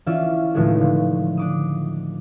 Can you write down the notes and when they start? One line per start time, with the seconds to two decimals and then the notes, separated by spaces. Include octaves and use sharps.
0.06 E3 C#4 D4 F4 D5 E5
0.54 C#2 A2 D#3 F3 G#3 A3
0.80 D3
1.37 D4 D6 D#6